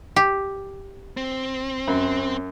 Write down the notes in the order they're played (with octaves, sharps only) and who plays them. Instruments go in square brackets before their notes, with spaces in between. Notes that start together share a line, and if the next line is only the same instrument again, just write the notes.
[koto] G4
[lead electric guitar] C4
[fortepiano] F#2